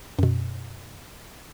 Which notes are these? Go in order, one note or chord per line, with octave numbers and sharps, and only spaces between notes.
F#2 B2